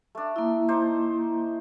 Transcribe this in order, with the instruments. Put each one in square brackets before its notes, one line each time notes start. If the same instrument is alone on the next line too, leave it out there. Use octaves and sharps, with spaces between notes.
[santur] A3 D4
[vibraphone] A#3 E4
[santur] D#4 C5 D5